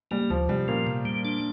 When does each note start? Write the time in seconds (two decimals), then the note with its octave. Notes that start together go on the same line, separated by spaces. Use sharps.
0.11 G3 A#3
0.30 D2 F3
0.49 C3 G3
0.68 A#2 F3 A#3
0.87 C3
1.05 G3
1.25 D4